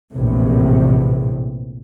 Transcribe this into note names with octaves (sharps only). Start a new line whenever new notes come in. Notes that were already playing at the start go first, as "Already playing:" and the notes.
A#1 E2 A2 C3